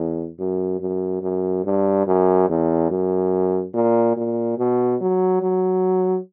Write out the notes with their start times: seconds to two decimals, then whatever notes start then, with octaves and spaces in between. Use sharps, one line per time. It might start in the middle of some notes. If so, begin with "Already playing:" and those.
Already playing: E2
0.39 F#2
0.80 F#2
1.22 F#2
1.65 G2
2.07 F#2
2.49 E2
2.90 F#2
3.74 A#2
4.17 A#2
4.58 B2
5.01 F#3
5.42 F#3